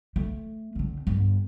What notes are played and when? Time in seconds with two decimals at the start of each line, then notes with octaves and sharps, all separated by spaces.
0.16 A3
0.75 D3 C4
1.07 G1